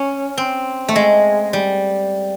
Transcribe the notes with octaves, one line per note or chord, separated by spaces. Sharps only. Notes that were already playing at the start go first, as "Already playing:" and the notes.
Already playing: C#4
C4
A3
G#3
G3